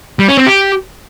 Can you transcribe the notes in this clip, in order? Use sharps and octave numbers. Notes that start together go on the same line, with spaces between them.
G3
C#4
C4
G4